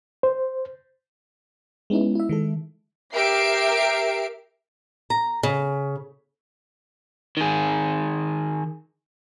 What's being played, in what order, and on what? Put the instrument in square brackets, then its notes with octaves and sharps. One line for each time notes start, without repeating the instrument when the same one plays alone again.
[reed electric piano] C5
[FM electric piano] G#3 B3 C#4 D#4 E4
E4 E5
D#3 G#3 A4
[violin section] G4 A#4 E5 C7 D7
[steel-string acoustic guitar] A#5
C#3
[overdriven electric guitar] D#3 G#4